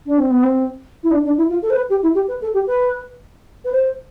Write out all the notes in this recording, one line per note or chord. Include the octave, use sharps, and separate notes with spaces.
D4
C4
B3
C4
E4
D4
D4
E4
F4
A4
C5
B4
G4
E4
G4
B4
A4
G4
B4
B4
C5